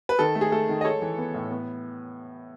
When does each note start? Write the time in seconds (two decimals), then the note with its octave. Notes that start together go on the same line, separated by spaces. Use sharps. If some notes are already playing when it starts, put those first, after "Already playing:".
0.09 B4
0.19 D#3 A4
0.35 A3
0.41 G#4
0.52 A3 A4
0.69 D#3
0.81 D#5
0.85 G#3 A4 C#5
1.02 E3
1.18 B3
1.34 A2
1.51 B3